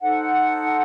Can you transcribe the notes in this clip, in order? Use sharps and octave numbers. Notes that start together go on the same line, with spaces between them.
D#4 A4 C5 F#5